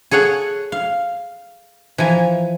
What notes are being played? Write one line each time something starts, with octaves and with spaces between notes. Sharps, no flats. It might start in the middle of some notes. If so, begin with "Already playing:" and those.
G#4 A4 C#5 F#5 G#5
F5
E3 F3 G#5 A#5